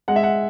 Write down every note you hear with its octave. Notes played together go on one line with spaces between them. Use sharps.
G#3 F#5
E5
F#5